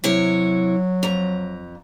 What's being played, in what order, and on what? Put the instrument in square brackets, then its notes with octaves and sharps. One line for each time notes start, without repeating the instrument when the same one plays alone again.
[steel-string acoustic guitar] C3 E4 C#5 [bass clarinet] F#3
[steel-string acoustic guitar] F2 A#5